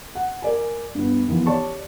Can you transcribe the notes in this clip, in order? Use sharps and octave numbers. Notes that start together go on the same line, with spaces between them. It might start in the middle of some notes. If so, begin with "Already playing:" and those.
F#5
A#4 D5 G#5
G2 B3
D#2 E3 F3 B3
G4 C#5 D5 A5 C#6